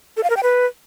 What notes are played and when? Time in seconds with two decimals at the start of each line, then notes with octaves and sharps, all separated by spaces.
0.17 A4
0.23 F5
0.30 A#4
0.37 G5
0.43 B4